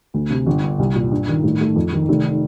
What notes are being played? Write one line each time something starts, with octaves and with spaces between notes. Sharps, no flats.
D2
C3
G1
G2
C2
A#2
G2
D#3
A2
A3
F2
D#3
F1